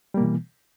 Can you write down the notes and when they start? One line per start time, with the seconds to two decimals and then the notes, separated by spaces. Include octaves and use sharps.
0.14 G3
0.17 A#3
0.20 B2
0.23 E3